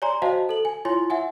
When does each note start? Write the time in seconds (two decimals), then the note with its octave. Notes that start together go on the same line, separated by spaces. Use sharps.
0.02 C#5 D5 G#5 A#5 C6
0.22 F#4 C5 D#5 F5 G5 A5
0.49 A4 F#7
0.65 G#5
0.85 E4 F4 C#5 G#5 C6
1.10 E5 F#5 G#5